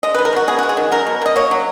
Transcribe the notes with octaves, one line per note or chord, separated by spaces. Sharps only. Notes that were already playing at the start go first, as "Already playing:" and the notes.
G#3 D#5
D#3 B4
A#4
D#3 F#4
B3 G#4
G#3 F#4
G#4
D#3
F#3 A#4
B2
B2 D#5
A#3 C#5
F#3